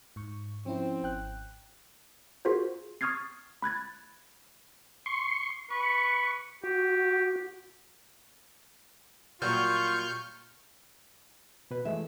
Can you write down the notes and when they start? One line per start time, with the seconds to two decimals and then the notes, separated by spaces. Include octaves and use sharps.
0.16 G#2 C#6
0.66 F3 C4 C#4 E4
1.03 G#1 G5 F#6
2.45 F4 F#4 G#4 A#4 C5
3.01 C#6 D#6 F6 G#6 A6 C7
3.62 B5 F#6 G#6 A6
5.06 C6 C#6
5.70 B4 C#6
6.63 F#4 G4
9.42 A#2 F#3 G3 F4 C#6 F6 G6
11.71 B2 B4
11.85 E3 G#3 A3 E5